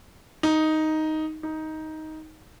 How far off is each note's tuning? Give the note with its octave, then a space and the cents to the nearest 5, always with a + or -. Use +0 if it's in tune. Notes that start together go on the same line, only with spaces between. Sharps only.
D#4 +5
D#4 +10